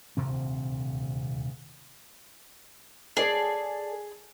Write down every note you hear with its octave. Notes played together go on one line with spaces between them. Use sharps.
D#1 D2 C3 C4
G#4 A4 D5